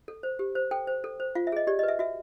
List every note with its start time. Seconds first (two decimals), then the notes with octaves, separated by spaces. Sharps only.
0.08 A4
0.23 C5
0.39 G4
0.55 C5
0.71 A4 G5
0.87 C5
1.04 A4
1.20 C5
1.35 F4 F5
1.47 E5
1.52 G#4 D#5
1.67 G4 D5
1.79 B4 D#5
1.88 E5
1.99 F#4 E5